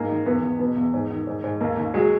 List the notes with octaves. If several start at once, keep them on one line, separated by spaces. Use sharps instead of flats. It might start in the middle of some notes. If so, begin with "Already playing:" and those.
Already playing: G#2 A#3
D#3
E2 B3
E2
B2 B3
E2
G#2
D#3
G#2
G#2
D#2 A#3
D#2
F#3 G#3